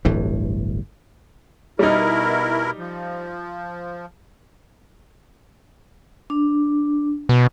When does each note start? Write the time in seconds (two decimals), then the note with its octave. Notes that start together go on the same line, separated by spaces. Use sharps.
0.05 D1 G1 G2 E3
1.79 B2 G3 D#4 E4 A#4
2.78 F3
6.30 D4
7.29 B2